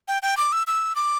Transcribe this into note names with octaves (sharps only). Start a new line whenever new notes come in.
G5
G5
D6
E6
E6
D6